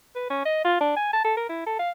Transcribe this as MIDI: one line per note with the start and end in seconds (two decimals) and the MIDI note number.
0.16 0.29 71
0.30 0.43 61
0.45 0.61 75
0.65 0.76 65
0.81 0.94 62
0.97 1.13 80
1.13 1.21 81
1.24 1.34 69
1.37 1.49 70
1.50 1.67 64
1.67 1.76 69
1.79 1.91 77